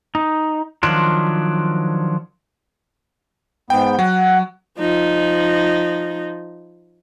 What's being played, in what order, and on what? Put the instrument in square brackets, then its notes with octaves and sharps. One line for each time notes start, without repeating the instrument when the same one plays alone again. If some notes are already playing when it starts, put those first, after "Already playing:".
[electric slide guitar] D#4
D#3 F3 F#3 D4 F4
[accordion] G#2 B3 [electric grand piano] G5
[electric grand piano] F#3 [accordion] F#5
[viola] F3 D#4